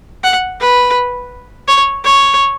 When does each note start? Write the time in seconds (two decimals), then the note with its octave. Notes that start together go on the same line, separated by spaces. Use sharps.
0.24 F#5
0.60 B4
1.68 C#5
2.04 C#5